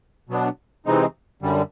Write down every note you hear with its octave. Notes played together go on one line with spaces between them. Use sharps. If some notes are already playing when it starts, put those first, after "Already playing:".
B2 F#3 B3 D4
C3 E3 G#3 C4 D#4
F#2 D3 G3